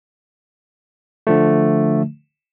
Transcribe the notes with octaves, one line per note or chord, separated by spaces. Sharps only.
D3 F3 A3